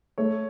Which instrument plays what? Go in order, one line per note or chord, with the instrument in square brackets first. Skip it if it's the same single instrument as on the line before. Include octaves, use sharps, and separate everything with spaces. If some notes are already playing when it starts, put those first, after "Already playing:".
[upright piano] A3 [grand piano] C#5